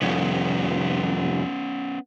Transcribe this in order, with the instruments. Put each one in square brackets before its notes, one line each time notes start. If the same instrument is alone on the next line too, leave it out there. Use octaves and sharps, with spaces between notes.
[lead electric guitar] C2 F2 [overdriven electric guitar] B3 C#4